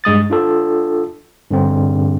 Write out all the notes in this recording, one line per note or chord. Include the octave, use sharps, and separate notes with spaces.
G2 G#3 D#6 A6
D4 F4 A4
G2 D3 C4